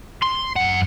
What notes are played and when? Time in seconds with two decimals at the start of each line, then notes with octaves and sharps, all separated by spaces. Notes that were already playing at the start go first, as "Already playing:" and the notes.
0.22 C6
0.56 F#2 F#5